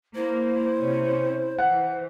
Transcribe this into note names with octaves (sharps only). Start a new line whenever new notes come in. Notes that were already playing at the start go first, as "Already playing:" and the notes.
A#3 E4 C5
C3 C#4
E3 F#5